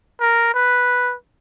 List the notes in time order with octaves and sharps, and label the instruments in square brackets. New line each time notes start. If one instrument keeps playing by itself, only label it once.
[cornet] A#4
B4